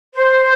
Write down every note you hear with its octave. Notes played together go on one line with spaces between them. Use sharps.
C5